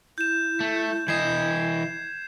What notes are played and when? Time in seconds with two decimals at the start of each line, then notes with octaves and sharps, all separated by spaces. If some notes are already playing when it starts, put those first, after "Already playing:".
0.18 E4 G6 E7
0.60 A3
1.08 E3 D#5 G#6 C7 E7